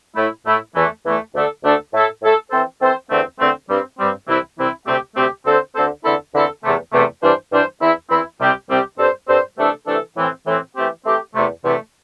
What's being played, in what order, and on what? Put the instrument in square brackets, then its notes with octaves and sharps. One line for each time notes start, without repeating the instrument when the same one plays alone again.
[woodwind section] A2 A3 E4
A2 A3 E4
E2 E3 A3
E2 E3 A3
D2 D3 A3 D4 A4
D2 D3 A3 D4 A4
A2 A3 E4 A4
A2 A3 E4 A4
E3 C4 A4 C5
E3 C4 A4 C5
E2 D3 A3 C4
E2 D3 A3 C4
G2 G3 C4
G2 G3 C4
C2 C3 E3 C4 E4
C2 C3 E3 C4 E4
D2 C3 A3 C4 G4
D2 C3 A3 C4 G4
D2 D3 C4 A4 C5
D2 D3 C4 A4 C5
E2 D3 C4 E4 A4
E2 D3 C4 E4 A4
E2 C3 A3
E2 C3 A3
G2 E3 G3 D4 C5
G2 E3 G3 D4 C5
E2 E3 C4 E4
E2 E3 C4 E4
C2 C3 G3 C4 G4
C2 C3 G3 C4 G4
G2 G3 C4 A4 C5
G2 G3 C4 A4 C5
C3 E3 A3 D4 A4
C3 E3 A3 D4 A4
A2 E3 C4
A2 E3 C4
E3 A3 C4 G4
E3 A3 C4 G4
E2 C3 A3
E2 C3 A3